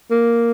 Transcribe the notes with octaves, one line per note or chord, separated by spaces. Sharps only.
A#3